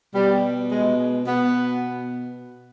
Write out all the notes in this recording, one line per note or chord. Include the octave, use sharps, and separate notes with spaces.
B2 G3
G#3
B2 B3